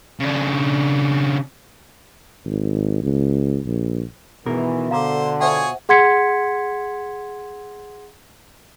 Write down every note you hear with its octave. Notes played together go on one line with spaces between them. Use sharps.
C#3 D4
G#1
C#2
A#1
B2 D#3 E3 G#4 A#4
D3 C5 F5 A#5 D6
F4 G#4 C5 C#5 E5 F#5
G#4 F#5 C6 G#6 B6 C#7